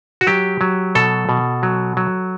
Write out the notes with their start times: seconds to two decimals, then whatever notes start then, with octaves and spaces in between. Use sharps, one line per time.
0.21 F#4
0.27 F#3 G4
0.61 F#3
0.95 B2 A4
1.29 B2
1.63 F#3
1.97 F#3